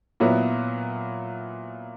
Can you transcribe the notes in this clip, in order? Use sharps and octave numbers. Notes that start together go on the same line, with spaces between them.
A#2 F#3 B3 E4